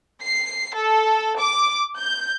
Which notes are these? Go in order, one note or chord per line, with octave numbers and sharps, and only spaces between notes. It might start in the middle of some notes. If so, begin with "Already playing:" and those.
C7
A4
D6
G6